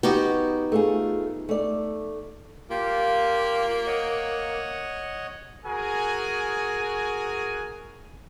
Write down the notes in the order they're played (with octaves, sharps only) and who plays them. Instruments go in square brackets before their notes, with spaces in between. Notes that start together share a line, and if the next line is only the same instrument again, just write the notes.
[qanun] B3 D#4 G4 [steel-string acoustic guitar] F#4
[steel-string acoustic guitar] A3 F4 G#4
A3 D5
[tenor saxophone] A#3 [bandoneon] F4 G4
[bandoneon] C#5 D#5 F#5
[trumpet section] F#4 G#4 A#4 G#5